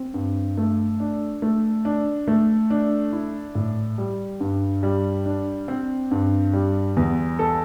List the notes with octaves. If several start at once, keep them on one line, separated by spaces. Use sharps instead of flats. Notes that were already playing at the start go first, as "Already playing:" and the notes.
Already playing: C4
G2
A3
D4
A3
D4
A3
D4
E4
A2
G3
G2
G3
D4
C4
G2
G3
E2
A4